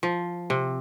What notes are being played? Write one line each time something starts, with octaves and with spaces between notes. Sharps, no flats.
F3
C3